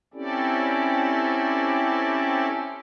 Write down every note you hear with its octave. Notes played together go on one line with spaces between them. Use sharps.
C4 C#4 E4 G4 A4 D5